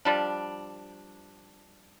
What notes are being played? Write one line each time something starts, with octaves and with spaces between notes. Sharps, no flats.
F3 G3 D4